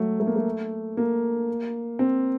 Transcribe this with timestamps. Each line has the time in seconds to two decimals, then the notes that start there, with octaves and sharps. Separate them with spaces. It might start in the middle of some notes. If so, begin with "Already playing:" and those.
Already playing: F#3 A3
0.20 A3
0.27 A#3
0.36 A3
0.97 A#3
1.99 C4